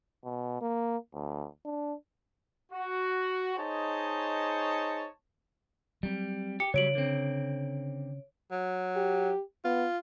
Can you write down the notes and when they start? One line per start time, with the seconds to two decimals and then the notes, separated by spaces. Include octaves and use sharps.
0.25 B2
0.61 A#3
1.14 D2
1.65 D4
2.72 F#4
3.56 D#4 G#4 C5 C#5 D#5 A5
6.03 F#3 G3 C4
6.60 G4 C#7
6.74 C#3 F#3 G3 C#5 D7 F#7
6.95 D3 C4
8.51 F#3
8.96 G4
9.65 B3 F4